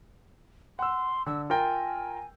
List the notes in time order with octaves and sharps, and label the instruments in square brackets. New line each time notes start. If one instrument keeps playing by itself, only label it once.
[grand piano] F#5 E6 [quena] C6
[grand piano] D3 [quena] E6
[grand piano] F4 A#4 G5 [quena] G#5